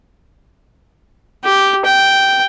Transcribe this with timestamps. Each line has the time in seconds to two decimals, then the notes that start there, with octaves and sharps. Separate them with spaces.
1.45 G4
1.85 G5